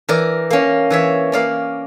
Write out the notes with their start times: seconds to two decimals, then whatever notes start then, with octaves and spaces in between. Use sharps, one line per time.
0.09 E3 A#4 D5
0.50 A#3 C#4
0.90 E3 C#5 E5
1.32 A#3 C#4 D5 F5